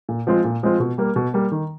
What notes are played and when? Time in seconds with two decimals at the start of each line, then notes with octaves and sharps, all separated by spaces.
0.09 A#2
0.27 F3 G#3 C4 F4
0.44 A#2
0.63 F3 G#3 C4 F4
0.80 B2
0.98 G3 A#3
1.16 B2
1.34 G3 A#3
1.52 D#3